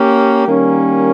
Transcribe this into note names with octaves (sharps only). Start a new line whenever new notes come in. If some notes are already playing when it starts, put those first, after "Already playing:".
Already playing: A#3 C#4 G4
D#3 G3 A#3 C#4